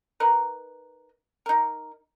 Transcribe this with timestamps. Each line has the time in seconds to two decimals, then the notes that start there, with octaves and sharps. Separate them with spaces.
0.20 D#4 A#4 B4
1.46 D#4 A#4